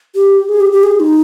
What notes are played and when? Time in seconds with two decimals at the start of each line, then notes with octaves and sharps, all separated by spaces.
0.15 G4
0.49 G#4
0.60 G4
0.72 G4
0.83 G#4
1.00 D#4